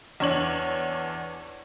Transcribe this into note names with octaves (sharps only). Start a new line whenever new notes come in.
E2 D4 C#5 F#7